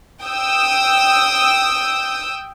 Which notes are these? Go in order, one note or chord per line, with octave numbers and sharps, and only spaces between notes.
G5 D#6 E6